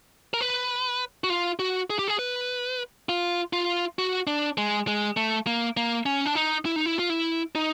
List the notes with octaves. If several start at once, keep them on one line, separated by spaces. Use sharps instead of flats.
A#4
B4
F#4
F4
F#4
G#4
G4
G#4
B4
F4
F4
F#4
D4
G#3
G#3
A3
A#3
A#3
C#4
D4
D#4
E4
D#4
E4
F4
E4
D#4